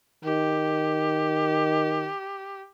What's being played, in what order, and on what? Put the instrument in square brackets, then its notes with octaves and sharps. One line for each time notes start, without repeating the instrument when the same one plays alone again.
[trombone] D#3 [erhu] G4